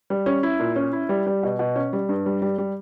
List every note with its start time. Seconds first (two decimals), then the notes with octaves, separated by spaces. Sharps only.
0.10 G3
0.26 C#4
0.43 E4
0.60 A#2
0.76 C#4
0.93 E4
1.09 G3
1.26 G3
1.43 B2
1.59 B2
1.76 C#4
1.93 G3
2.09 G2
2.26 G3
2.42 G3
2.58 G3